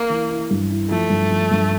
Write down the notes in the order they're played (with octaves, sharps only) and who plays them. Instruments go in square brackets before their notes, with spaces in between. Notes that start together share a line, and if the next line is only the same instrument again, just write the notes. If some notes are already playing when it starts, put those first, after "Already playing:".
Already playing: [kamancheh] A#3
[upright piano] E3
E4
G2
E4
[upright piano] F3 [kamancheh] A3
[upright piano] G2
F3
G2